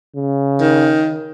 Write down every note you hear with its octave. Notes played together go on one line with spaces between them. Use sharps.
C#3
D#3